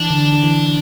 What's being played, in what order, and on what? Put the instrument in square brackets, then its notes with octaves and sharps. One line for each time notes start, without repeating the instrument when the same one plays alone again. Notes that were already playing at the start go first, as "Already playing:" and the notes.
Already playing: [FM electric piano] E3 [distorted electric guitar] D4
[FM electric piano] D3
D3
E3